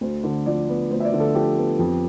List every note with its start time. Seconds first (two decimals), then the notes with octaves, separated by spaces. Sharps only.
0.01 D2 C5
0.24 D3
0.46 F3 D5
0.68 B3
0.91 D2 C5
1.00 E5
1.05 D5
1.13 D3
1.20 A4
1.35 F3 G4
1.57 B3
1.79 F2